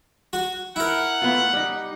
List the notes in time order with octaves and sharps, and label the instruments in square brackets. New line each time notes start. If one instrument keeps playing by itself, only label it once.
[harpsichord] F#4
[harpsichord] E4 A#4 [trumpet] F#5
[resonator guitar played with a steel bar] A3 B3 F4
G3 D#4